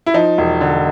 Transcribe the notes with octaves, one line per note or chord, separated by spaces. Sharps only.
E4
F3 D#4
E1
D3